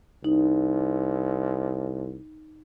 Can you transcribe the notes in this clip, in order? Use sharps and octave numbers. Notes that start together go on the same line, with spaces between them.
C2 D#4